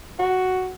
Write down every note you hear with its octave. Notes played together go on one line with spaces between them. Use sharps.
F#4